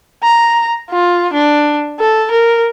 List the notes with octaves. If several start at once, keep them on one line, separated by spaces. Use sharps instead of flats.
A#5
F4
D4
A4
A#4